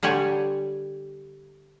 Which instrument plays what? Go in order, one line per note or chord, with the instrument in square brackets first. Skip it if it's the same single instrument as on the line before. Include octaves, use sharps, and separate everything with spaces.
[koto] D3 G3 G4 C#5 G#5